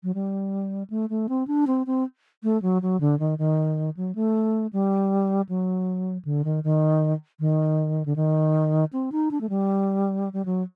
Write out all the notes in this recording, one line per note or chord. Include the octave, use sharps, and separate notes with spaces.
F#3
G3
A3
A3
C4
D4
C4
C4
A3
F#3
F#3
D3
D#3
D#3
F#3
A3
G3
F#3
D3
D#3
D#3
D#3
D3
D#3
C4
D#4
D4
A3
G3
G3
F#3